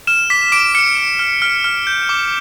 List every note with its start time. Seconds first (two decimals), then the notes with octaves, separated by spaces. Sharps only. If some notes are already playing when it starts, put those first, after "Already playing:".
0.07 F6 E7
0.30 D6 B6
0.52 D6 D7
0.75 F6 C#7
0.97 D6
1.19 F6
1.42 F6
1.64 F6
1.87 G6
2.09 D6